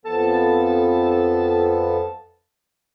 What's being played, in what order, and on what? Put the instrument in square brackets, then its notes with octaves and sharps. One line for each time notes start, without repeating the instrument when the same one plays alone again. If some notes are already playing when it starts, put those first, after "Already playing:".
[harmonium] F2 F3 B3 [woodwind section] A4 A5